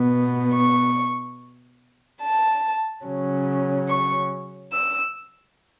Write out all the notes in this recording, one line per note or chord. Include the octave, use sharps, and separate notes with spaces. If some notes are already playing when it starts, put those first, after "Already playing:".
Already playing: B2 B3
C#6
A5
C#3 F#3 C#4
C#6
E6